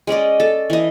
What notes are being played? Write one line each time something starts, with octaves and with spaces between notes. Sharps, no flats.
G#3 C#4 D5 D#5
A4 A5
E3 D#5